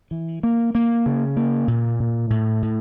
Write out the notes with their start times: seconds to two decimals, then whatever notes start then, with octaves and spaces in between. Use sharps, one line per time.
0.11 E3
0.43 A#3
0.75 A#3
1.06 C#3
1.37 A#3
1.68 A#2
2.00 A#2
2.30 A2
2.62 A2